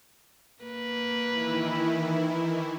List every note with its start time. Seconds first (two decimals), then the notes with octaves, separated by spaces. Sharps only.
0.63 A#3 B4
1.30 D#3 E3 E4